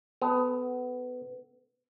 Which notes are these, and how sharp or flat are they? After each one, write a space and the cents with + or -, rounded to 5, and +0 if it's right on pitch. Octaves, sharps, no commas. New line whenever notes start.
B3 +20 A4 +0